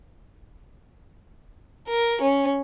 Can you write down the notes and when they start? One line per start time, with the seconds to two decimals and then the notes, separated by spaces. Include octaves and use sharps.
1.88 A#4
2.21 C#4